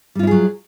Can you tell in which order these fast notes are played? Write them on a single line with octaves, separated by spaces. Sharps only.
G3 F4 E4 G#4 F#3